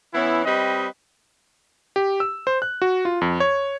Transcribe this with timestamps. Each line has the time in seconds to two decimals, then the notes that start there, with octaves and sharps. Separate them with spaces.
0.14 E3 B3 C#4 E4
0.45 G3 C4 B4 D#5
1.96 G4
2.20 E6
2.47 C5
2.62 F#6
2.82 F#4
3.05 F4
3.21 F2
3.40 C#5